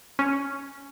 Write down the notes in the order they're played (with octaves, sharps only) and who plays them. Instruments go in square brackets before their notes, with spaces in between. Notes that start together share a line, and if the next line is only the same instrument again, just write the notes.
[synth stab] C#4